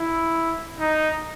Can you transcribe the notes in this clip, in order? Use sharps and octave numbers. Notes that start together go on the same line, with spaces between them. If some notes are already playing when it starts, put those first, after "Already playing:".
Already playing: E4
D#4